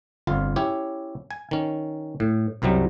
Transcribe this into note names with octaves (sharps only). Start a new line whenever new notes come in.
G1 F2 F4 F5
C#4 E4 G4 C#5
G#5
D#3 C#4
A2
C2 F#2 C3 F#3 G3